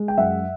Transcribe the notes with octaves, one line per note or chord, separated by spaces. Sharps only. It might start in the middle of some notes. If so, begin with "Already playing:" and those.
Already playing: G#3
G5
F#2 E5 F#5